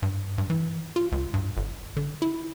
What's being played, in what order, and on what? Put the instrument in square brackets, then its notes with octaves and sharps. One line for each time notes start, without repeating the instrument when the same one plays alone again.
[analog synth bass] G2
G2
E3
F4
C#2
G2
G1
D3
E4